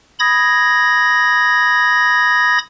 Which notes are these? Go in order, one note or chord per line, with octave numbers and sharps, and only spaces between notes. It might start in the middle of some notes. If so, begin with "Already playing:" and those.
B5 D#6 G#6 A#6